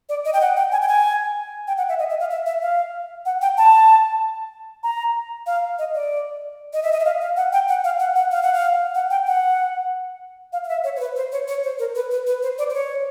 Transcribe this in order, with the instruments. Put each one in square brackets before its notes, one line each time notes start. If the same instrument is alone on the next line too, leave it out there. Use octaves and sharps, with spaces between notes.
[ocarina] D5
D#5
G5
F#5
G5
G#5
G5
G#5
G5
F#5
E5
D#5
E5
F5
E5
E5
F5
F#5
G5
A5
A#5
F5
D#5
D5
D#5
E5
D#5
E5
F5
F5
F#5
G5
F#5
F5
F#5
F#5
F5
F#5
F5
F#5
G5
F#5
F5
F5
E5
C#5
C5
B4
C5
C#5
C#5
C5
A#4
B4
B4
B4
C5
D5
C5
C#5